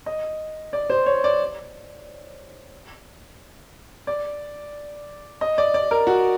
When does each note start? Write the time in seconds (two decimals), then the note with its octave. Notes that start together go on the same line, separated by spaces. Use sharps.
0.06 D#5
0.73 D5
0.90 C5
1.06 C#5
1.24 D5
4.07 D5
5.41 D#5
5.58 D5
5.74 D5
5.91 A#4
6.07 F#4